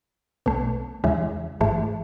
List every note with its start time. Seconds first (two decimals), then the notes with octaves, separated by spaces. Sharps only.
0.46 B1 B2 A3
1.04 E2 C#3 E3 G#3
1.61 G#1 G#2 E3 A3